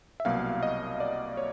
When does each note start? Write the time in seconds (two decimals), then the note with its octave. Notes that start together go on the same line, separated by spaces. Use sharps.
0.20 E5
0.25 C2 B2 F#3 A#3 F5
0.63 D#5
1.00 D5
1.37 C#5